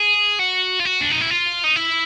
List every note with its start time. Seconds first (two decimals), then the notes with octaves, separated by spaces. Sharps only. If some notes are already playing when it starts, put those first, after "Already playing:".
Already playing: G#4
0.39 F#4
0.80 F4
0.85 F#4
1.01 D4
1.11 D#4
1.21 E4
1.30 F4
1.64 D#4
1.76 E4